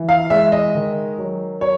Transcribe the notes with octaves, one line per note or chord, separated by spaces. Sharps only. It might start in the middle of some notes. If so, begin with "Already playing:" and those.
Already playing: E3
F5
G#3 E5
D#5
D#3
F#3
F#3 C#5